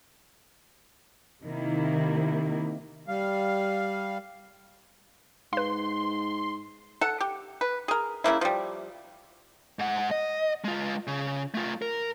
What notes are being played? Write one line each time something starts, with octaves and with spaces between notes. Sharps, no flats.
C3 D#3 A#3 E4
G3 F5
G#2 B4 F5 C6
A4 F#5
G4
B4
G#4 A#4
C#3 F3 A#3 E4
F3 G3
G#2 F#5
D#5
G#3 F4
C#3
A3 F4
A#4